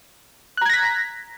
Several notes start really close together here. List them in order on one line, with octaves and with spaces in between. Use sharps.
F#6 A#5 G#6 A#6 B6